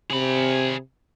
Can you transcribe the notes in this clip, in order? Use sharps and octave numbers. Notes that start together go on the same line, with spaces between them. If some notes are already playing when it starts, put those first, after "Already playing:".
C3 G#4 B5